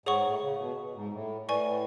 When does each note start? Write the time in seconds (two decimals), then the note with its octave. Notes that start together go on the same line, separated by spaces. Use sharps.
0.06 G#2 G#4 C#5 F#5 C#6
0.24 A2
0.41 C#3
0.59 B2
0.95 G#2
1.13 A2
1.49 A2 B4 D5 G#5 C#6